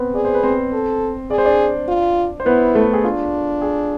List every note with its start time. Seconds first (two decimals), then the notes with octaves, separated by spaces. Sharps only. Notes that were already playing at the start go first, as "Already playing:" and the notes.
Already playing: B3 C4 B4 C5
0.15 G#4 D5
0.25 C5
0.35 B4
0.43 C4 C5
0.73 A4
1.30 G#4 D5
1.38 C5
1.45 D4 D5
1.88 F4
2.40 C5
2.46 B3 E4 B4
2.75 A3 A4
2.93 G#4
3.04 D4 F4
3.62 G#4